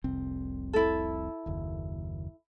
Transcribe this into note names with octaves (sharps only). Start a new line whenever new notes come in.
F1 C2 C4
E4 A4
F#1 D#2